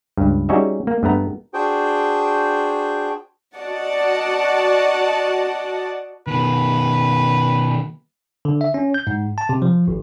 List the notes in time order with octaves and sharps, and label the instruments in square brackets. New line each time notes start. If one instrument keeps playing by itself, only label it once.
[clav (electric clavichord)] C#2 G2
G3 C#4 D#4 F#4 G#4 E5
A#3
G2 A3 B3 A#5
[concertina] D4 F#4 G#4 C5 G5
[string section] F#4 D5 D#5 F#5 A5
[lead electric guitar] B2 D#3 [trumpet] B4
[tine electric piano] D3
E5
C#4
G6
G#2
A5
C3
F3
G#1